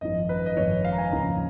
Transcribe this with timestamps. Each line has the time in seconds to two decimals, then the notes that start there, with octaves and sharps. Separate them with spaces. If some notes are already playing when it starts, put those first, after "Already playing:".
0.01 G#1 F#2 F3 D#5
0.29 B4
0.46 D#5
0.57 G#1 F#2 F3 C#5
0.84 F5
0.92 A#5
0.98 G#5
1.12 D#2 C#3 F3 A#3 A#5